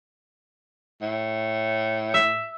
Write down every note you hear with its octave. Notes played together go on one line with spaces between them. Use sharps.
A2
E5